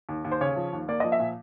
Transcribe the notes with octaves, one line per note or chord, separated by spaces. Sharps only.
D#2
D#2
C5
C#3 C#5
F3
D#2
A#3 D5
F3 D#5
E5
A#2